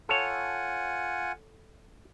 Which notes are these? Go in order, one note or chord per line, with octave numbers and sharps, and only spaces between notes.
F4 A4 C#5 F#5 G#5